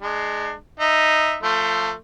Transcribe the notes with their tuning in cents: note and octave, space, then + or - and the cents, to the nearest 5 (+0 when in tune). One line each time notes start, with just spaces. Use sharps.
G#3 +15 D4 +35
D#4 -5 E5 +0
F3 +0 A3 +20 C6 +0